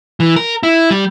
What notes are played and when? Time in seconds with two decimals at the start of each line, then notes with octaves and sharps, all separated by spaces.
0.20 E3
0.36 A#4
0.63 E4
0.91 G3